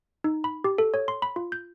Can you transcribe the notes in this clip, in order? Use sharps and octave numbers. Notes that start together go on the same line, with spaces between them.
D#4
B5
G4
A4
C#5
C6
B5
F4
G6